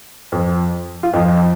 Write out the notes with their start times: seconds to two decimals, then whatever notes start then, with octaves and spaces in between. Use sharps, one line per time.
0.32 F2 F3
1.03 F4
1.13 F2 F3 D#4